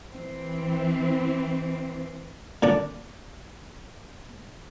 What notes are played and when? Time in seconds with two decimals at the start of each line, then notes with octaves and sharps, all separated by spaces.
0.13 E3 C4
2.63 A#2 D3 D4